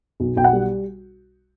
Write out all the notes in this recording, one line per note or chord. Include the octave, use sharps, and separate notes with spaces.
B1
B1 G5
F#5
G3